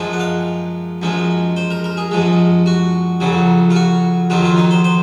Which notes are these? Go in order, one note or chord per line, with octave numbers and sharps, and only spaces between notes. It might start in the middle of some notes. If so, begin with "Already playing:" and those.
Already playing: F#2 F3 G#3
F#5
F5
F#2 F3 G#3
C5
A#4
A#4
G#4
F#2 F3 G#3
F#4
F2 C#3 F#3
F4
F#4
F2 D#3 F#3 F4
F4
D#4
C5
C5